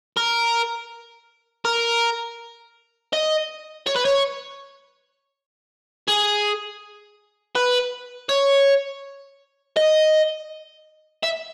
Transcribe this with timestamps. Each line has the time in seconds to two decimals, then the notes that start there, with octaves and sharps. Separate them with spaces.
0.17 A#4
1.65 A#4
3.13 D#5
3.87 C#5
3.96 B4
4.05 C#5
6.08 G#4
7.56 B4
8.29 C#5
9.77 D#5
11.24 E5